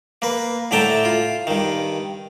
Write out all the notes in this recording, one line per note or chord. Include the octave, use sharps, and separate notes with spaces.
A#3 B4
A2 D3 E5 G5 A5 A#5
F4
G2 D#3